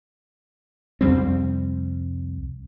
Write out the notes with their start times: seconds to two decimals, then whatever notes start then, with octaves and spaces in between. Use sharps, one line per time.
1.01 C2 F2 G3 C4